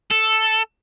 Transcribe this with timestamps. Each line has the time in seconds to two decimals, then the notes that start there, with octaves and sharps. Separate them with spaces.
0.11 A4